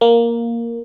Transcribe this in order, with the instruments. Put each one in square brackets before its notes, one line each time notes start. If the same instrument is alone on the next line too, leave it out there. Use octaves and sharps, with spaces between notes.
[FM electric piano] A#3